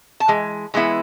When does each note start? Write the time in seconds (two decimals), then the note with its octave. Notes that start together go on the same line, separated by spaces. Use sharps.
0.20 A5
0.28 E3 G#3
0.74 E3 G#3 B3 E4